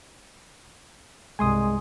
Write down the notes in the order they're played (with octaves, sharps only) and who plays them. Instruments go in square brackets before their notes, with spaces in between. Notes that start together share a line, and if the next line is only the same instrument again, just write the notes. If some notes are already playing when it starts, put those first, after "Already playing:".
[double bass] C2 G2 [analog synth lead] G#3 [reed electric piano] G#5 C6 D#6